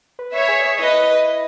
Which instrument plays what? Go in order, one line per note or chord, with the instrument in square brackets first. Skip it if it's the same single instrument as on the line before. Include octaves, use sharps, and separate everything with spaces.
[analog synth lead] B4
[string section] C#5 E5
[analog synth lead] G#4
[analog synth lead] E4 [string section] B4 D#5